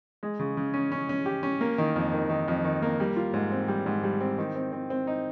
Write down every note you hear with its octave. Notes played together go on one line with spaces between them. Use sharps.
G#3
C#3
C#3
C#4
C#4
C#4
G4
C#4
A#3
D#3
F2
D#3
D#3
F2
D#3
A#3
G3
F4
G#2
C4
G3
G#2
G3
C4
D#3
C4
C4
C4
D#4